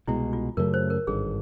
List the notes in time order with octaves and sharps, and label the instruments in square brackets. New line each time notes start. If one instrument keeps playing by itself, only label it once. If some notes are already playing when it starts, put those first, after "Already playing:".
[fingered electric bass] C2 B2 G#3 [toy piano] E4
[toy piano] F4
[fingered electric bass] F#2 C#3 F#3 A3 [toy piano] A#4
[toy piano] C5
A#4
[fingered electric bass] G#1 G2 D3 [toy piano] G#4